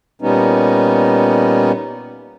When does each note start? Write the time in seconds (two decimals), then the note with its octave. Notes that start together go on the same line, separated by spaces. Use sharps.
0.22 A#2 G3 B3 C#4 D#4